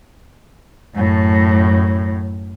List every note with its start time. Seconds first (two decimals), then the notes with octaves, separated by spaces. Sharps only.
0.95 F#2 A2